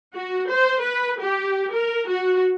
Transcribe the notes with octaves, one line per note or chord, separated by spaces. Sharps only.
F#4
C5
B4
G4
A#4
F#4